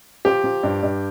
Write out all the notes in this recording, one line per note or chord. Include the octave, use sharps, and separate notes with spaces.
F3 G4
F3
G2
G2